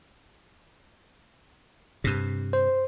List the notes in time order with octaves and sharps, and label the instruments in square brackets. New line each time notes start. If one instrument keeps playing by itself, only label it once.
[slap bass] G2 C3
[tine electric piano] C5